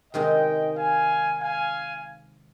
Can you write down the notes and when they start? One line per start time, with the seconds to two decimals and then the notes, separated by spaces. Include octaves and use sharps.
0.14 C3 D#3 G#3 C4 D#4 D#5 G5
0.77 F5 G#5
1.41 F5 G#5